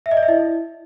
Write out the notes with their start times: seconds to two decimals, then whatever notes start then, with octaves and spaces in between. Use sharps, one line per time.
0.06 E5
0.11 D#5
0.17 D5
0.23 E5
0.28 E4